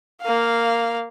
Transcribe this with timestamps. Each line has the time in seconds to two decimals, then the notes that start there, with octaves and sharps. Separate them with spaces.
0.22 A#3 F5